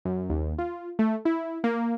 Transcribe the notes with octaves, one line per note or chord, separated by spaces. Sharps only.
F#2
D#2
F4
A3
E4
A#3